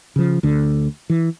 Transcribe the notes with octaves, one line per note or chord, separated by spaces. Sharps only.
C#3 F3
D2 D3
E3